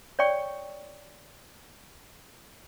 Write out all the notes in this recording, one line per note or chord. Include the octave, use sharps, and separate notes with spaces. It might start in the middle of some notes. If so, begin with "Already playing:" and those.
C#5 D5 G5 C#6